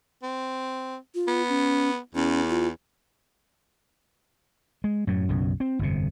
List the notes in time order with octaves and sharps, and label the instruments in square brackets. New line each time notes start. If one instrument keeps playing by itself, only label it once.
[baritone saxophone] C4
[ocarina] F4
[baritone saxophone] B3
[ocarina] C#4
[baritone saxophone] E2 [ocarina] C#4
[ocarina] F4
[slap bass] G#3
F#2 A2 F#3
B1 F#2 C#3
C4
G1 F2 C3